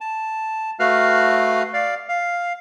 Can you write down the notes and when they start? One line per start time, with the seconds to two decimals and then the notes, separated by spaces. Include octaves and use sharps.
0.01 A5
0.79 A3 F#4 B4 F5 F6
1.73 D5 F5
2.09 F5